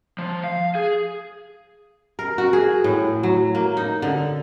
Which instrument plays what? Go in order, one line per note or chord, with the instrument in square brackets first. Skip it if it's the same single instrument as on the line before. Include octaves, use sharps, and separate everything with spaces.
[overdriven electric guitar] F3
F5
G#4
[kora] A#4
F#4
G#4
A2
F#3
A#3
D#4
D3